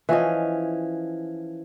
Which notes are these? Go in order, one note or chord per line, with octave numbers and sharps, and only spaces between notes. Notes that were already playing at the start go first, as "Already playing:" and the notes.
E3 F3 C#4 D#5